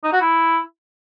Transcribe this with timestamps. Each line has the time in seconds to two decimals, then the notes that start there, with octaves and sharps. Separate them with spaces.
0.04 D#4
0.13 F#4
0.21 E4